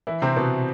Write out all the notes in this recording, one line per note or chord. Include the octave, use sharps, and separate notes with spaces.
E3 E4
C3 C4
B2 B3